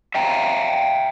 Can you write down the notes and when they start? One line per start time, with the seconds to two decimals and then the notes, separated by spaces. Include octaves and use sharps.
0.15 E5 F5 G5 A#5